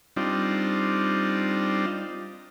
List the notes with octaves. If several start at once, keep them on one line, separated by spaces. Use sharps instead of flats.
G3 C4 D4 D#4 F4